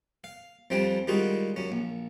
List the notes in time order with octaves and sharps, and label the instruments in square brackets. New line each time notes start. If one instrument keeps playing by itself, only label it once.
[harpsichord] F5
F2 F3 G3 C4 D4 G#5
D#3 G3 G#3 F4 F#4 G#4
F#2 C#4
A#1